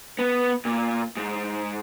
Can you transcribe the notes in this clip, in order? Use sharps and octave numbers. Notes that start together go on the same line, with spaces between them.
B3
A#2
G#2